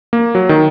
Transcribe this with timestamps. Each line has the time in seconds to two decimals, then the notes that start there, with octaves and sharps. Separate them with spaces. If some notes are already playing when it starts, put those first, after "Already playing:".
0.13 A#3
0.35 F#3
0.49 D#3